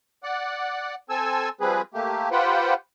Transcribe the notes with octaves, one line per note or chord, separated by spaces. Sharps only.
D5 F#5
C4 A4 G#5 E6
F3 G3 C4 G#4 B4
A3 A#3 G4
F4 G4 B4 C5 F#5 G5